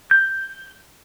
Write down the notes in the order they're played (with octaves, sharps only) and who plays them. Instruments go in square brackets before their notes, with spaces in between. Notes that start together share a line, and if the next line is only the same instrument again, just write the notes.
[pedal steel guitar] G6